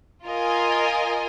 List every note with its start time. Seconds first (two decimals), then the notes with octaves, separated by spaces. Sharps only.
0.25 F4 A#4 D#5 G#5